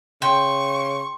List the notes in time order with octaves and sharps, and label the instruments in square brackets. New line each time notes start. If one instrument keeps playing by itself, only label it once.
[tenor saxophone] C#3 [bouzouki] G5 [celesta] C6 [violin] C#6